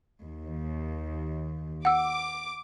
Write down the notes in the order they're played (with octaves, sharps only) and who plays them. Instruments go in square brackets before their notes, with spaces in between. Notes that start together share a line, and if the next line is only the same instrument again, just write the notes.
[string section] D#2
[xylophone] F#5 E6 [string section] D6